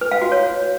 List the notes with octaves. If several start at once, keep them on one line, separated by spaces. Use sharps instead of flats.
B4
F5
F#4
C#5